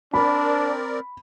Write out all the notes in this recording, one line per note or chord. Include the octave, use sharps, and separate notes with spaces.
C4 D4 A#4 D5 B5